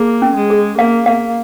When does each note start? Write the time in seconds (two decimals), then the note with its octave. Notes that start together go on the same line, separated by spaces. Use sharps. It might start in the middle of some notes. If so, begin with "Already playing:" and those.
Already playing: A#3 G#4
0.22 C#4
0.36 G#3
0.50 G#4
0.78 A#3 F5
1.06 A#3 F5